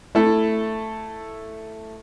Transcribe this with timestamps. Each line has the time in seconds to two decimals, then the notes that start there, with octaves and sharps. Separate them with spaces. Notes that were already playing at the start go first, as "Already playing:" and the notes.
0.15 A3 E4 A4